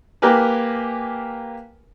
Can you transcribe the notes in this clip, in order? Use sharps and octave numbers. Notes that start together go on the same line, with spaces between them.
A#3 G4 A#4 B4 G#5